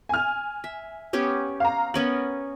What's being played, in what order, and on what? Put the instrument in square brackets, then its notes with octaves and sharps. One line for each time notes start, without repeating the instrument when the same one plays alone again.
[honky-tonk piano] G#5 F6
[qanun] E5
B3 C#4 G4
[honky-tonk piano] F5 A#5
[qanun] B3 C#4 A#4 [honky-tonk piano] F#7